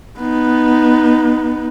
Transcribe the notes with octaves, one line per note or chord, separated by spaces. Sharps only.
B3 D#4